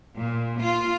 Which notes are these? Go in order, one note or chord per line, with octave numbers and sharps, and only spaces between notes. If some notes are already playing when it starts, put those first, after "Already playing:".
A#2
F4